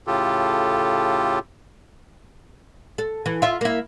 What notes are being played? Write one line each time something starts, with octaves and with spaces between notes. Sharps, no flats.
A2 C#3 F4 G4 A4
A4
E3
F4 E5
A#3 E4